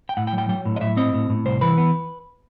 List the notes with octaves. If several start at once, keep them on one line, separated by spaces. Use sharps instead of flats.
G5
A2 F#5
G5
F#3
G5
F#3 G5
A2
D#5
A2 E5
C4 D#5
A2
A2
C2 C5
E3 B4
B3